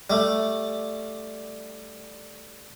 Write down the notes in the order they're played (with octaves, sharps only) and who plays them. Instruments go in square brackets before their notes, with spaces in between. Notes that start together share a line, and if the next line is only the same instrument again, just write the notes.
[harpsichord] G3 A3